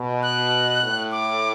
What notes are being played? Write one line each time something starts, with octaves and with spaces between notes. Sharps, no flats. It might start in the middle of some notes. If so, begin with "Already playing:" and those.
Already playing: B2
F#6
A2
D6